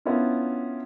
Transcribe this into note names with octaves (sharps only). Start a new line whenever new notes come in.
B3 C#4 D4 E4 F4